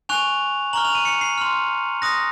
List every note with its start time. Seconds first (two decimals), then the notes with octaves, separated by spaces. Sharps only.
0.09 G#5 C#6 F#6 F7
0.73 A#5 C#6 F6 F#7
0.85 F7
0.95 D#7
1.05 C#7
1.21 C7
1.38 C6 F6
2.02 C6 D#6 F#6 A#6